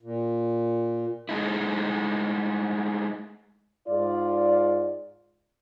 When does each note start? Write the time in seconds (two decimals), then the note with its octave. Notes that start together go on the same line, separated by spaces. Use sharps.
0.03 A#2
1.29 G#3 A3 D#4 E4
3.88 G#2 F4 D5